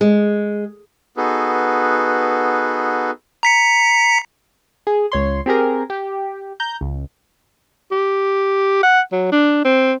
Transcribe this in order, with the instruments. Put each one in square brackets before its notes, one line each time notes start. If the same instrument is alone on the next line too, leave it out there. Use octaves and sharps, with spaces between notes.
[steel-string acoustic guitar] G#3
[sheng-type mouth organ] B3 D#4 F#4 G#4 A4 B4
[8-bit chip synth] A#5 B6 C#7
[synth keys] G#4
C#2 C#5 C6
C4 G4 G#4 A#4
G4
A#5 G6
C#2
[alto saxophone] G4
F#5
F#3
D4
C4